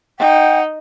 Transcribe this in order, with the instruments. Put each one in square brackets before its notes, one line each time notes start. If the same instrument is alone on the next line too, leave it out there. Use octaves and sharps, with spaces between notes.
[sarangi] D#4 [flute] F#5 [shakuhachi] G5